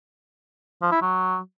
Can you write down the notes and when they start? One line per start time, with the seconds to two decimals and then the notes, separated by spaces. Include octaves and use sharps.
0.82 F3
0.92 E4
1.02 F#3